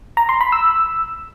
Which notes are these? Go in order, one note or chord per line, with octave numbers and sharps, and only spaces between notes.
A#5
C6
B5
E6